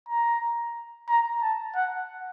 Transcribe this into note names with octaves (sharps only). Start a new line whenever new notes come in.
A#5
A#5
A5
F#5